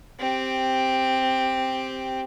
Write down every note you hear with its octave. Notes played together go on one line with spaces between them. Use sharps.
C4 G4